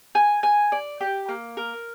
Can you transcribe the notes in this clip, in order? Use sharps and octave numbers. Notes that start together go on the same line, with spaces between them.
G#5
G#5
D5
G4
A#3
A#4